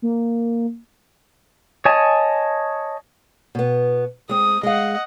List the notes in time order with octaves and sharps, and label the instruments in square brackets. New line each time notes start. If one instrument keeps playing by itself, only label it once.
[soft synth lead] A#3
[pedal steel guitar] C#5 D#5 G#5 A5
[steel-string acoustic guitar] B2 B3
[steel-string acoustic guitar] G#3 C4 [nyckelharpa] D#6
[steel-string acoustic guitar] G#3 F5 [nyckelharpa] D#5 F#5